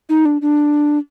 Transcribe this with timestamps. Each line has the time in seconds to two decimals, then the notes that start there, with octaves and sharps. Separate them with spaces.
0.09 D#4
0.25 D4
0.42 D4